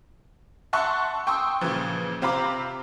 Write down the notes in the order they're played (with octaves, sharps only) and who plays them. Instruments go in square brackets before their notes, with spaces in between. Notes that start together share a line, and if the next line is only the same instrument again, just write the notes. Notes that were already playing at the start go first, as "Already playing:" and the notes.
[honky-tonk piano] E5 F#5 A5 C6 C#6 F#6
G5 C6 C#6 D#6 E6
A#2 C#3 E3 F3
C3 C4 F4 A#5 B5 D6